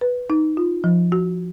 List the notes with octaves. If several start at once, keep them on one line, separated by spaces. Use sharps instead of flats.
B4
D#4
F4
F3
F#4